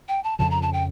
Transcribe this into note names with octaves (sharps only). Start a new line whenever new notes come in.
G5
A5
F2 C#3 F3 A5
A#5
A5
G5